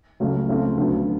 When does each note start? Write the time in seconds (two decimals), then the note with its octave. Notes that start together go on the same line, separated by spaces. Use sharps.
0.20 C#2 C#3 F#3 A3
0.49 C#3 F3 A3 C4 F4
0.77 D2 D3 F#3 B3